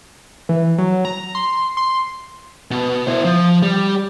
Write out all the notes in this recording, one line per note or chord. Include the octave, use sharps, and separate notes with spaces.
E3
F#3
A#5
C6
C6
B2
E4 C5
F3
G3